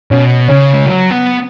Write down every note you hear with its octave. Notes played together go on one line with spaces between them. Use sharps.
B2 C#4
C#3 C#4
G#3
F#3
B3